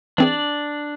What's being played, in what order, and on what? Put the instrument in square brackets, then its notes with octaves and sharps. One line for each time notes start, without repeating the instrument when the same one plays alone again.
[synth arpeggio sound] E3 C4 G#4 [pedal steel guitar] D4 D5